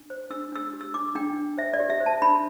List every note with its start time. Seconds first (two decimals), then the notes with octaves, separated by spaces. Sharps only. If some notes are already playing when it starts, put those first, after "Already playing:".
Already playing: D4
0.10 C5
0.30 D4 E6
0.52 D4 E6
0.73 G4
0.81 E6
0.94 D4 D6
1.15 D4 G5
1.37 D4
1.57 C5 E5
1.73 D5
1.80 G4
1.90 E5
2.00 C5
2.06 A5
2.22 D4 B5